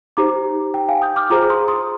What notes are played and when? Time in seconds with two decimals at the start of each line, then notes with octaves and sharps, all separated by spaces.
0.17 D#4 G4 C5 A#5 D6
0.74 G5
0.89 F5 G#5
1.02 D#6 G6
1.16 D6 F6
1.30 F4 G#4 C5 A#5 D6
1.49 C6 D#6
1.68 C6 D#6